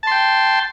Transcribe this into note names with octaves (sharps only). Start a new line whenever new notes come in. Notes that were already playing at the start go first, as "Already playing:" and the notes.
G5 A5 C6